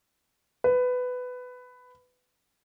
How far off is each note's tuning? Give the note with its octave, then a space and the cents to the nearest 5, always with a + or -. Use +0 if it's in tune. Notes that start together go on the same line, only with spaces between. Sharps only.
B4 +15